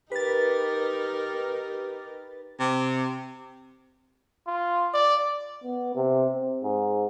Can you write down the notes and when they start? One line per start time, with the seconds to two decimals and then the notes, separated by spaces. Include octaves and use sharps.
0.12 D#4 G4 A#4 B4 A6
2.60 C3
4.47 F4
4.94 D5
5.64 B3
5.95 C3
6.34 C4
6.63 G#2